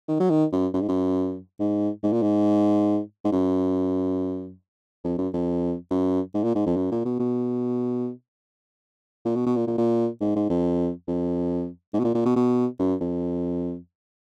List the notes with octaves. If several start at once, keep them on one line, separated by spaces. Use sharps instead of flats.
D#3
F#3
D#3
F#2
F#2
G#2
F#2
G#2
G#2
A#2
G#2
G#2
F#2
F2
F#2
F2
F#2
G#2
A#2
G#2
F2
F#2
A#2
B2
B2
A#2
B2
B2
A#2
A#2
A#2
G#2
G#2
F2
F2
G#2
B2
A#2
A#2
B2
B2
F#2
F2